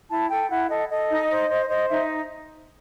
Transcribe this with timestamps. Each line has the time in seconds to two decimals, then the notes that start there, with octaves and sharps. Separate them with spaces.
0.10 E4 A5
0.29 A4 G5
0.49 E4 F#5
0.69 A4 D#5
0.90 A4 D#5
1.10 D#4
1.30 C5
1.49 C5
1.69 C5 D#5
1.89 D#4 E5